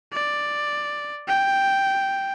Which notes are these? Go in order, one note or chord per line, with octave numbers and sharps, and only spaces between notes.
D5
G5